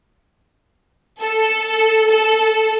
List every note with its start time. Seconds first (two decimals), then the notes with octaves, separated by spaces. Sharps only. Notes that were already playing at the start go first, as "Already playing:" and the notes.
1.21 A4
2.09 A4